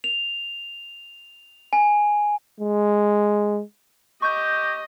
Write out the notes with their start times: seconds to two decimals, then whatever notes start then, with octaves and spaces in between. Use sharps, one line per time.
0.04 F7
1.73 G#5
2.60 G#3
4.22 G4 D#5 C#6 G6